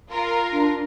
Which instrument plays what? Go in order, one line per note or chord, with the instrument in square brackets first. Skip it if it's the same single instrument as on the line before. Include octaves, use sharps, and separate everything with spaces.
[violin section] F4 A#4
[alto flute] D4